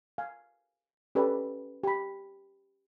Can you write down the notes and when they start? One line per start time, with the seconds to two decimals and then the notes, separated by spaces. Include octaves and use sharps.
0.18 F5 G#5
1.15 C#4 G4 A4 B4 D5
1.84 G4 B5